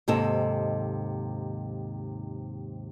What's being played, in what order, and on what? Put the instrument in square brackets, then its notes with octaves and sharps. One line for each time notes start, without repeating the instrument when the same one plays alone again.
[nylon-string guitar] D#2 G#2 C3 C4 A4 D#5